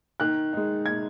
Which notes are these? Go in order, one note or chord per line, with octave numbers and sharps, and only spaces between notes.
D#3 F#6
G#3 D#4
D#3 G#6